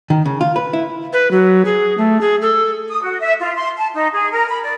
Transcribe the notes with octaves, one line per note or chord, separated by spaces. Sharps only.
D#3
C#3
F4
B4
E4
B4
F#3
G#4
A3
G#4
A4
D#6
F#4
E5
F4
C6
A5
D#4
G#4
A#4
B5
D5